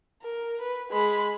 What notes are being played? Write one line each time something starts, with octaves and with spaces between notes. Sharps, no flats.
A#4
B4
G#3 B5